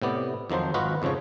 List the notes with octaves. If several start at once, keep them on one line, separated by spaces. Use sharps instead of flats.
A2 C3 B3 D5
F2 D#3 F3 F#3 C5
G#1 F4 F#4 B4 D#5 F#5
F2 G#2 C#3 F3 C#5